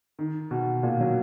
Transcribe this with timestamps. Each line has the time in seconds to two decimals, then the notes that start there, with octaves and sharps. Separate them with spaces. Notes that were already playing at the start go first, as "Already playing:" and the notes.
0.19 D#3
0.51 B2
0.83 A#2
1.00 F#3